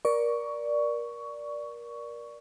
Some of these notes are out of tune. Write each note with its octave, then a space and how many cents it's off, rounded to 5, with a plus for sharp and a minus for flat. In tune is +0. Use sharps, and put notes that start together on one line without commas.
A#4 +25 D5 +0 C#6 +15